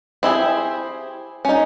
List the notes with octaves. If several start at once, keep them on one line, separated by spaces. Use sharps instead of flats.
C4 E4 G4 G#4
C#4 D#4